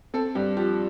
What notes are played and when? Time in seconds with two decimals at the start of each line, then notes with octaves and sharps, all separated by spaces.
0.14 C4 A4
0.35 G2 G4
0.57 F3 G4